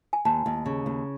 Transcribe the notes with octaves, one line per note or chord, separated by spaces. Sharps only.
G#5
D#2 A5
D#2
C#3
D#2